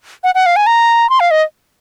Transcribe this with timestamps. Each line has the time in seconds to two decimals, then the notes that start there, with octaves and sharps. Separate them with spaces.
0.24 F#5
0.35 F#5
0.46 F5
0.56 G#5
0.67 A#5
1.10 C6
1.20 F5
1.31 D#5